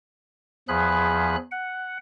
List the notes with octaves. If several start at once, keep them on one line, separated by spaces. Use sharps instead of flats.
E2 F3 G#4 B5 F#6
F#5